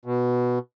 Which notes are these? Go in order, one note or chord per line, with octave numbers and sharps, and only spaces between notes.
B2